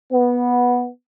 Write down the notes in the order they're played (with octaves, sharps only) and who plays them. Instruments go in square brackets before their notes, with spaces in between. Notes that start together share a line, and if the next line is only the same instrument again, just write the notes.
[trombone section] B3